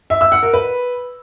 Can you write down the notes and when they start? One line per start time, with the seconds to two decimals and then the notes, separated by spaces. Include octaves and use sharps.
0.10 E5
0.21 E6
0.32 F#5
0.43 A#4
0.53 B4